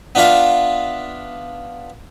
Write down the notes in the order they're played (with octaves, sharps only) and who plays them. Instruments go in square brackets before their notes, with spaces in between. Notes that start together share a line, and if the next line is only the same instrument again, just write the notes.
[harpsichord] B3 D4 F4 E5 F5